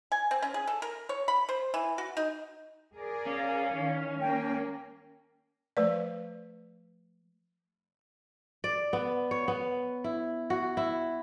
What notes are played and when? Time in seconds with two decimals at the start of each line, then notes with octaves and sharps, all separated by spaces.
0.12 G#5
0.31 C4
0.42 C#4
0.54 G#4
0.67 A4
0.82 A#4
1.09 C#5
1.28 B5
1.49 C5
1.74 E3
1.98 F#4
2.17 D#4
2.96 G#4 A#4 D5
3.26 C#4 F5
3.72 D#3 E3
4.19 A#3 G5
5.77 F3 A3 B4 D5
8.64 D5
8.93 B3
9.31 C#5
9.48 B3
10.04 E4
10.50 F#4
10.77 E4